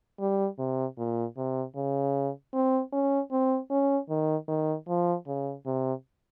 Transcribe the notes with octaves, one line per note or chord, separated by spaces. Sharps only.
G3
C3
A#2
C3
C#3
C4
C#4
C4
C#4
D#3
D#3
F3
C#3
C3